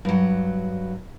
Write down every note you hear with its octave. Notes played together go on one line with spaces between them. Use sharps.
G2 F#3